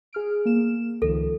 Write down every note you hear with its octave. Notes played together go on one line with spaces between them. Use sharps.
G#4 F6 D7
A#3 E7
C#2 D#3 F3 A4